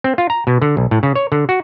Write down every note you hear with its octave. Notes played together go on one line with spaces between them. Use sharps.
C4
F4
A#5
B2
D3
B1
A2
C#3
C#5
D3
F#4